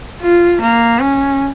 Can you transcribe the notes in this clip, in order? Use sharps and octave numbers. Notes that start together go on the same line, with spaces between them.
F4
A#3
C#4